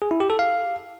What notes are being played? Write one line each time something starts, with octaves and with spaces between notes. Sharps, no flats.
G#4
E4
G4
A4
F5